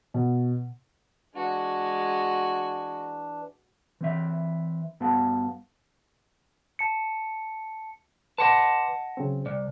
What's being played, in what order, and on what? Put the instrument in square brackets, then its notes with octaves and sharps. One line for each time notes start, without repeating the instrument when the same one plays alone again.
[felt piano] B2
[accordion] E3 D4 [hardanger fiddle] G#3 F#4
[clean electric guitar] E3 C4 E5
G2 B3 F#4 F5 A5
[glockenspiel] A5 C#7
[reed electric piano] B4 C6 D6 [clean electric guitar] D#5 F#5 A5
[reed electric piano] C#3 F#3 C4
[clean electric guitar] C2 [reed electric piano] D5